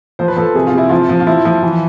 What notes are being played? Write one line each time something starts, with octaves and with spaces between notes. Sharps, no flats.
F3 C5
B4
F3 A4
C3 G#4
F4
C3 E4
F3 F4
F3
F4
F3 E4
F3
E3